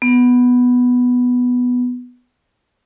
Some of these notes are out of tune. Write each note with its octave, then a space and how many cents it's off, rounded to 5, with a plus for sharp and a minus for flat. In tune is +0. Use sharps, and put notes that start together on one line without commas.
B3 +0